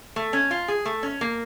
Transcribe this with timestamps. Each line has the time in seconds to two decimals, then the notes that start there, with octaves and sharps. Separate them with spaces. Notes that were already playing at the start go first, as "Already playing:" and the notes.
0.16 A3
0.33 C#4
0.51 F4
0.68 G#4
0.85 A3
1.03 C#4
1.21 A#3